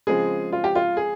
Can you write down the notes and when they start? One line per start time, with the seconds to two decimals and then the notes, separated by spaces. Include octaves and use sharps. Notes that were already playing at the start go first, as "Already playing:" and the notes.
0.07 C#3 F3 G#3 C4 G#4
0.53 F4
0.64 G4
0.75 F4
0.97 G#4